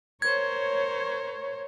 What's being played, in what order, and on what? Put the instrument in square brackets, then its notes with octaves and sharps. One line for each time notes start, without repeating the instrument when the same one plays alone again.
[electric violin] A#4 C5 [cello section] C#5 [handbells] G#6